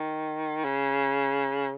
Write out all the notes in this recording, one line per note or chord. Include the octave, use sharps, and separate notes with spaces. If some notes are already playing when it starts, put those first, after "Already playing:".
Already playing: D#3
C#3